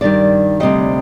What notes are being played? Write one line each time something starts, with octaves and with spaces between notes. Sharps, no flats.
G2 D#3 G3 D5
D2 C3 G3 D#5